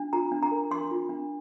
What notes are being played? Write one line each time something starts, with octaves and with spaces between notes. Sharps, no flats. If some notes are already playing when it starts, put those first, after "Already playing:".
Already playing: D4
F4 A#5
D4
A#5
A#4
D4 C6
F4
D4